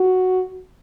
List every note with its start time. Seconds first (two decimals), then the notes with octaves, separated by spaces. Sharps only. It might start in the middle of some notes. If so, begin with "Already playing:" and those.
Already playing: F#4